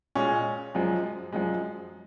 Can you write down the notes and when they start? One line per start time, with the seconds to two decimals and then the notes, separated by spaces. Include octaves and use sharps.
0.15 A#2 G#3 C#4 G#4
0.75 F#2 F3 G#3
1.33 F#2 F3 G#3